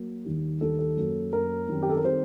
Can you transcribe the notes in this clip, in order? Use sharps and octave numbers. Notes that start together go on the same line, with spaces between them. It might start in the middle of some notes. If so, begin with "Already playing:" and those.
Already playing: F#3 A#3
D#2 D#3 G3
D#2 D#3 G3 A4
A4
F#2 F#3 A#3
F#2 F#3 A#3 A#4
F#2 D#3 G3 C4
G4
A4
A#4
D#3 G3 C4 C5